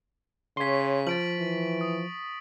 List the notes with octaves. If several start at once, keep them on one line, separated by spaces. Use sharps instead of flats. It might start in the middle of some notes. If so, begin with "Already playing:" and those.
C#3 C#5 C6 C#6 B6
F3 A6 D7 F#7
E3
D#6